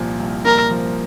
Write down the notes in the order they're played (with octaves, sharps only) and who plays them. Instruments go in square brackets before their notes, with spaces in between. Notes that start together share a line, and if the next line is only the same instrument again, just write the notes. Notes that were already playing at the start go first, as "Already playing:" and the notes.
Already playing: [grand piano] C2 A#2 F3
C2
[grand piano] A#2 [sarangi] A#4
[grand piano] F3